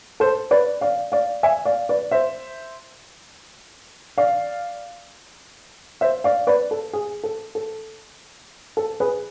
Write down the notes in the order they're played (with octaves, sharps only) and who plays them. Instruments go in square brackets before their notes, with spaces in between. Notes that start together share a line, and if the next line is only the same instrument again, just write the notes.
[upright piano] A4 C5
B4 D5
D5 F5
D5 F5
E5 G#5
D5 F5
B4 D5
C5 E5
D5 F5
C5 E5
D5 F5
B4 D5
A4
G#4
A4
A4
A4
G#4 B4